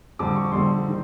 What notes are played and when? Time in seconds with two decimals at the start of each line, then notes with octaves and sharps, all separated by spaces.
0.19 F2 D3 G3 D6
0.36 C#6
0.51 F2 D3 G3 C6
0.88 D#3